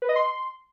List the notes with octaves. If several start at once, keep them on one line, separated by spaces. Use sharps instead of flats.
B4
D#5
C6